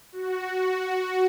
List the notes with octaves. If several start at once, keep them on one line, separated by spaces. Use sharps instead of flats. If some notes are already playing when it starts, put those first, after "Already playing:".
F#4
F#4